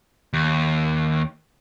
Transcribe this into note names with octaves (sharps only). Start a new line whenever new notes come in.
D#2